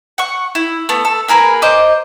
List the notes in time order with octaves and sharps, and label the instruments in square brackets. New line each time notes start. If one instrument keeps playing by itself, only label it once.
[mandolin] F#5 C#6
E4
A3 B3
A4
A#3 G#4 A#4 B4
C5 D#5 D6